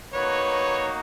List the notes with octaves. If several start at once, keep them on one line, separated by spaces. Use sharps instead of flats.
A#3 D#4 F#4 B4 C#5